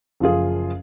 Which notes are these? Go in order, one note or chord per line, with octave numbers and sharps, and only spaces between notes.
F#1 F3 F4 G#4